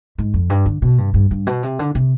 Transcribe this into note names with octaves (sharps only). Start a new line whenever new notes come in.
G#2
F2
G2
D3
B2
G2
G2
G2
B2
C3
D3
C3